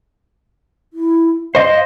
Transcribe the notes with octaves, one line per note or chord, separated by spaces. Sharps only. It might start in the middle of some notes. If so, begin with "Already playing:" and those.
E4
C5 D#5 F5